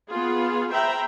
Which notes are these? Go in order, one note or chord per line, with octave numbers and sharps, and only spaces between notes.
B3 F4 G#4
C5 E5 G5 A#5 B5